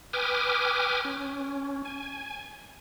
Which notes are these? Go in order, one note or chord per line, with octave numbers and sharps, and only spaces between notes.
B4 G5 G#5 D6 D#6 F6
C#4
G#5